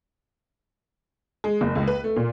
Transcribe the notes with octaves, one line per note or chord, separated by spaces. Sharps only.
G#3
F#1
C#2
B4
A3
A#2